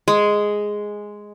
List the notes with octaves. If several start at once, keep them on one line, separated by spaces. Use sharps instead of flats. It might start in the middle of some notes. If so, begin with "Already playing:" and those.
G#3